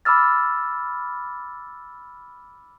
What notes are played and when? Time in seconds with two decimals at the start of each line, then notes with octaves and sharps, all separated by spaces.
0.05 B5 D6 E6 F6 A6